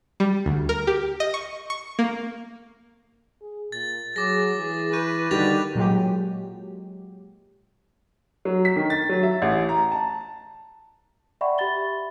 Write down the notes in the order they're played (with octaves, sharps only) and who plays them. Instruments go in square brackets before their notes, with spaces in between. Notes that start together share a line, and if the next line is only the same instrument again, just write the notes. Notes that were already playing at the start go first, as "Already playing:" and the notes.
[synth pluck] G3
D2
A#4
G4
D#5
C#6
C#6
A#3
[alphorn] G#4
[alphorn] A#2 [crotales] A6
[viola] F#3 [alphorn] G#4 [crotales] D6 A#6
[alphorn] E3 [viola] G#4
[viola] B4 [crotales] C#6 G6 D#7
[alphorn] D3 [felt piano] D#3 G3 G4 [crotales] A6 B6 F7
[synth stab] A#2 F#3 G#3 G4
[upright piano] F#3
B6
D#3
A6
F#3
E5
A1
A#5
A5
[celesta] D5 E5 F#5 G5 B5 C#6
G4 E5 B5 A6 G7